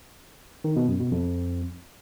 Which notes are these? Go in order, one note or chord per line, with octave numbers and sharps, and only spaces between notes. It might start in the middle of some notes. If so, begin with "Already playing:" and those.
D#3
B2
F#2
B2
F2